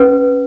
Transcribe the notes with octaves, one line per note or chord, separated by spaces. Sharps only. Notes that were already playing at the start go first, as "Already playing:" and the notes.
Already playing: C#4 B4